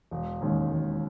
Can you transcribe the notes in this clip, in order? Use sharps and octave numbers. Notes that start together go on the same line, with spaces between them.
E1
D#2 D#3 G#3 C#4
E1